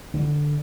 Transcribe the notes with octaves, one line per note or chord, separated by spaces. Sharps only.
D3